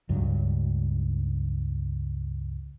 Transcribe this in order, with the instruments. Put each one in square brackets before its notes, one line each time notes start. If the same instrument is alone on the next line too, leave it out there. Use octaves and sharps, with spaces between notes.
[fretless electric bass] C#2 G2 F#3